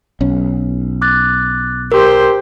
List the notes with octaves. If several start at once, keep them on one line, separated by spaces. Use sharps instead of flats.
B1 C#4
D6 F#6 A6
G4 A#4 C5 C6